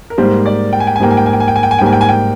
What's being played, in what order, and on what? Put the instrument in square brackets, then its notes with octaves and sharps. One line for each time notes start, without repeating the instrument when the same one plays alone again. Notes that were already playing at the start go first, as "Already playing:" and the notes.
[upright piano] A#4
[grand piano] G#2 G3 A#3 [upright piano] C5
[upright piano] D5
G5
G#5
G5
G#5
[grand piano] G#2 G3 A#3 [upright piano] G5
[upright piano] G#5
G5
G#5
G5
G#5
G5
G#5
G5
G#5
G5
[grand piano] G#2 G3 A#3 [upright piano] G#5
[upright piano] G5
G#5
G5